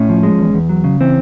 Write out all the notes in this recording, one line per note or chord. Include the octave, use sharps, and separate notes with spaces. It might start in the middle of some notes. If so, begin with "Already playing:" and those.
Already playing: A2 C#4
F3
G#3
E2
E2
F#3
C#3
E3 C4